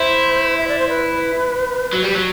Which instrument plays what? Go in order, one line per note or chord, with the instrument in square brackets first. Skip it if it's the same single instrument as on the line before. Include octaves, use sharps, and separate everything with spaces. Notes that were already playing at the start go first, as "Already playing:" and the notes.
Already playing: [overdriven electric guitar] E4 [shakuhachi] C5
[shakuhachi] E5
D5
C5
B4
[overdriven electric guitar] F#3
G3
F#3